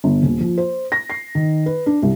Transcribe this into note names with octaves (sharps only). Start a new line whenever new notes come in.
G1
D#1
F3
C5
A#6
C7
D#3
B4
D4
C2